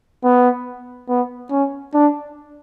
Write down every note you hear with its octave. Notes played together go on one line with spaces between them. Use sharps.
B3
B3
C#4
D4